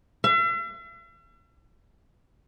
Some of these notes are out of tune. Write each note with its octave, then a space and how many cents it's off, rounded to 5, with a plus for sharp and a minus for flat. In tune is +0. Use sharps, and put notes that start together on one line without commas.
E5 +45